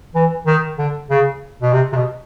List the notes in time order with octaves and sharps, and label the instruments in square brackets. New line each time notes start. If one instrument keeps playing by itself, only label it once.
[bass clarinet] E3
D#3
D3
C#3
B2
C3
C3
B2